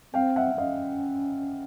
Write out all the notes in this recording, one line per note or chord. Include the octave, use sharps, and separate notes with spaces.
C4 F5 G5
E5 F#5
C4
C#4 D#5 F5